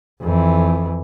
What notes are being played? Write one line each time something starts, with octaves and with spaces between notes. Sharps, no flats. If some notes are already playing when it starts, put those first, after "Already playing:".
F2 E3